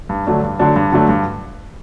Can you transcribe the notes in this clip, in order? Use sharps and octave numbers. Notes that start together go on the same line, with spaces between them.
G2
D3 F#3 A3 D4
G2
D3 F#3 A3 D4
G2
D3 F#3 A3 D4
G2